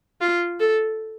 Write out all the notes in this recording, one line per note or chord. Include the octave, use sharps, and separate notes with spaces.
F4
A4